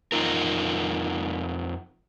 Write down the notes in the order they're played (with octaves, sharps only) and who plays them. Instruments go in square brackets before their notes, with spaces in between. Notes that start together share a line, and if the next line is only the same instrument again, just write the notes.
[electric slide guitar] F2 D#4 F4 A#4